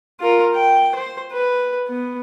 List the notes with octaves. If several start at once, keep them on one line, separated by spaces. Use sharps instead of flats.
F4 A#4
G5
C5
B4
B3